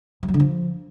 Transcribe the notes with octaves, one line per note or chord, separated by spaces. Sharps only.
G3
F#3
D3
F3